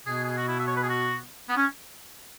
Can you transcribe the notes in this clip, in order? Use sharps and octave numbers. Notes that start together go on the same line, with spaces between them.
B2 B3 G#4
G#4
F#4
E4
E5
C#5
B4
G#4
F#4
B3
C#4